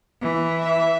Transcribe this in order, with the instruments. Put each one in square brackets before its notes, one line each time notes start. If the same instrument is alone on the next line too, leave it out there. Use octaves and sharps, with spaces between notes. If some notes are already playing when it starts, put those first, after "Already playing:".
[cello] E3
[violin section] E5